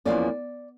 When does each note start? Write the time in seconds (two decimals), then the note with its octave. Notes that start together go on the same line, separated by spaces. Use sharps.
0.05 E2 C3 F3 A#3 C#4 D5